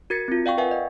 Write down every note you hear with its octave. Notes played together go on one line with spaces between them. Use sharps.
F#4 A#4 G#6 A6 B6 C#7
C4 F4
D5 F5 G5 C#6
A#4 B4 E5 F#5 G#5
D#5